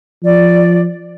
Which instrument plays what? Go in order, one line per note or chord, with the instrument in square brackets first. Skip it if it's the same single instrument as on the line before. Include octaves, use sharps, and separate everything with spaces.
[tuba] F3 [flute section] D5